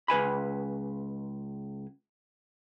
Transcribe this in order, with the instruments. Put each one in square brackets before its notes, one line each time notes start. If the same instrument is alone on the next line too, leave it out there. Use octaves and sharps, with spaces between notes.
[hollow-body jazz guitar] C#2 B4 G#5 B5